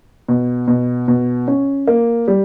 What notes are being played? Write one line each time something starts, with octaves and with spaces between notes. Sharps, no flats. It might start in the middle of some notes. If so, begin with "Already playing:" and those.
B2
B2
B2
C#4
A#3
G3